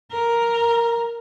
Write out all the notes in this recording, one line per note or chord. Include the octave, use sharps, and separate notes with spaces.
A#4